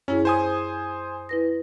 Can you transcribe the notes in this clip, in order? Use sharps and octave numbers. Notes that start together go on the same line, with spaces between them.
F#2 C#4 E4 G#4
C5 G#5 D#6
E4 B4 A#6